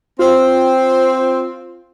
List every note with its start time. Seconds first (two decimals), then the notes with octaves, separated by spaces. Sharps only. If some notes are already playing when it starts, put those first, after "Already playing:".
0.19 C4 F4